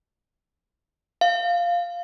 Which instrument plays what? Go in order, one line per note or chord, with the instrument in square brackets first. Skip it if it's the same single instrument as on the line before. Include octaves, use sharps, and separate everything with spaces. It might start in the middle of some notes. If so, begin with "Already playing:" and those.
[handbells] F5